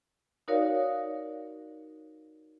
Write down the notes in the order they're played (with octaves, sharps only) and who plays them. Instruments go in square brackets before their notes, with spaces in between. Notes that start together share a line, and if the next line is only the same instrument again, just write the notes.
[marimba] D#4 F#4 A#4 C#5 D5 F5